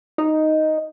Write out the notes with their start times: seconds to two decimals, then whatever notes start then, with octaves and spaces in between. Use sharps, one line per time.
0.18 D#4